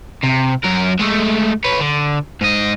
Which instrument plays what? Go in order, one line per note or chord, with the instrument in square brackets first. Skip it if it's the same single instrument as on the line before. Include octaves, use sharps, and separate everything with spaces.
[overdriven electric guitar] C3
F#2 A#4
G#3 A3
B4 C#5
D3
G#2 D#5